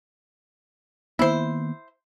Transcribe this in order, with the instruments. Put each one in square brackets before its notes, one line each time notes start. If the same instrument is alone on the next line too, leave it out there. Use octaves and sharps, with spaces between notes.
[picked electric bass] D#3 A#3 B3 [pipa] E4 C5